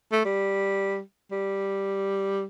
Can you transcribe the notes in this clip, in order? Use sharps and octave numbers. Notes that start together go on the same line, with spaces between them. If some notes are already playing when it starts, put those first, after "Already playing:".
A3
G3
G3